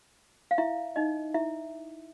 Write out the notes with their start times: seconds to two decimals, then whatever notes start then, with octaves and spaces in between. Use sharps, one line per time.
0.51 F5
0.58 E4 E5
0.96 D#4 D#5
1.34 E4 E5